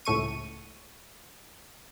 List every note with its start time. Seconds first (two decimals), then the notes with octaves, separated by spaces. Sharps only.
0.05 C#2 A2 A3 C#6 D#7